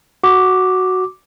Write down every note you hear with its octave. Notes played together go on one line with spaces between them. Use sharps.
F#4 D6